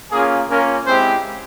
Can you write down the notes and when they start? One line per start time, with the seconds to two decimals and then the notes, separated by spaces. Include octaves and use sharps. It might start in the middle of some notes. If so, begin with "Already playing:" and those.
0.12 A#3 C#4 F4 G#4
0.49 A#3 C#4 F4 A#4
0.86 G#3 C4 E4 G4 C5